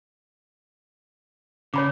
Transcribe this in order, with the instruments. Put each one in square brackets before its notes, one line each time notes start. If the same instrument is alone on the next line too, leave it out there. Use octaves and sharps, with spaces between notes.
[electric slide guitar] C#3 [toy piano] C#5 B5 D6